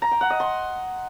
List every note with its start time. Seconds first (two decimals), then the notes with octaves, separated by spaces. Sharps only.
0.02 A#5
0.11 G5
0.21 F#5
0.30 D#5
0.40 C6